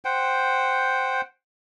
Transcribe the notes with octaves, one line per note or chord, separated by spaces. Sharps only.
C5 F#5 G5